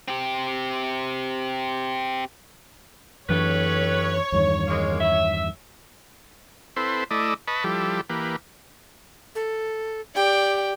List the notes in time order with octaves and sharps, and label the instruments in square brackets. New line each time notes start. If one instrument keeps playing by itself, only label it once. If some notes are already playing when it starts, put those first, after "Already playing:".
[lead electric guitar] C4 G4
[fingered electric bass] F#2 E3 D4 [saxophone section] A3 G4 B4 [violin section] C#5
[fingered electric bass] E2 G2 D#3
[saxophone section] G#3 A#3
E5
[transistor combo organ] C4 E4 A4 B4 C5
A3 E4 D5 D#5
B4 D#5 A5 B5 C#6
F3 G3 E4 G4 A4
E3 A#3 G4 B4
[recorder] A4
[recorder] G4 [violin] D5 G5